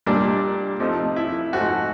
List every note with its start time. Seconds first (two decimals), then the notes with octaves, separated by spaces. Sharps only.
0.06 A#2 G3 A#3 D4
0.80 C3 F3 A3 D#4
1.16 E4
1.53 G#2 F3 A3 F#4